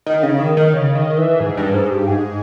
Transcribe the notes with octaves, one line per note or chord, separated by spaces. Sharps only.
D#3
C#3
D#3
D#3
C#3
D#3
E3
G#2
G2
G#2
G2
G#2